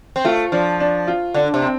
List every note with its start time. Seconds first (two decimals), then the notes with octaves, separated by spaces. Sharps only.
0.16 C4
0.25 A3 F4
0.52 F3 D4
0.80 D4
1.08 F4
1.34 D3 D4
1.54 C3
1.62 C4